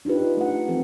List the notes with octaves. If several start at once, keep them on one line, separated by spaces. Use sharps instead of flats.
D4 D#4 F4 G4 B4
A3 D4 F#5
E3 F3 C4 A4